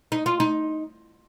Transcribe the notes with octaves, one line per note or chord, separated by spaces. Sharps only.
D#4
F4
D#4